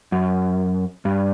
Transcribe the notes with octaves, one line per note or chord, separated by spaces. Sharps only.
F#2
G2